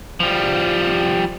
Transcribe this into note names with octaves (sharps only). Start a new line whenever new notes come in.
F3 G3